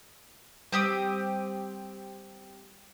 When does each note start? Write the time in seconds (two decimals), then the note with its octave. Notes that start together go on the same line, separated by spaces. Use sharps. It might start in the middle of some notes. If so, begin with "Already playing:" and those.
0.73 G3 C4 G4 D#6